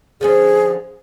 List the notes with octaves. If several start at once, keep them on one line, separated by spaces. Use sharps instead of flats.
D3 F3 C#4 G#4